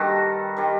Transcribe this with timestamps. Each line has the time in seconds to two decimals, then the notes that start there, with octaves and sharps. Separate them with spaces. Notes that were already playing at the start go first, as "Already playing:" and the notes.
Already playing: G2 D#3 G3 F#4 A4
0.57 D#3 G3